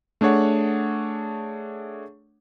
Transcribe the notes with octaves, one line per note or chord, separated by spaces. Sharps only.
A3 D4 G#4 C#5 F#5